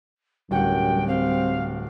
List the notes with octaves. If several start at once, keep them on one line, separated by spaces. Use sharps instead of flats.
D1 F#2 G3 F#5 G5
C4 F5